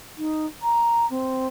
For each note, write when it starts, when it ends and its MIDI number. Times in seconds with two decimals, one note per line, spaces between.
0.18 0.46 63
0.62 1.06 82
1.10 1.47 60